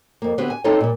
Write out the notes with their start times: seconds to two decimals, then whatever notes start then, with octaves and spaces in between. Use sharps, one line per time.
0.22 F2 A#3
0.38 D3 B3 C4 G4 B4
0.50 G#5
0.64 C4 D#4 F4 A4 C#5 D#5
0.81 A#2 G3